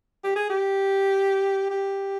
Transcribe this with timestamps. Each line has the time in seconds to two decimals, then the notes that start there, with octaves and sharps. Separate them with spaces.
0.24 G4
0.36 G#4
0.50 G4
1.70 G4